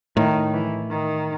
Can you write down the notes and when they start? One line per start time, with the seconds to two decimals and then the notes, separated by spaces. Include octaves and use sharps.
0.16 A2 D#3
0.54 E3
0.91 D#3